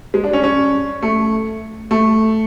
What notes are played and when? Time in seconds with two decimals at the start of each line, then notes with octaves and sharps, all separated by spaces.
0.14 G#3
0.24 D4
0.33 C#4
0.44 C#4
1.03 A3
1.91 A3